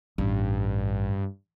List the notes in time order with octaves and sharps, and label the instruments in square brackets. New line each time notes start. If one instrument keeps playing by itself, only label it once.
[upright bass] A1 [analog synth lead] G2